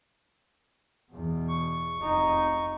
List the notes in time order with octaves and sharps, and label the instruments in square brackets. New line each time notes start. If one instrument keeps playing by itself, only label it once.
[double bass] E2 B2
[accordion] C#6
[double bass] F1 D#4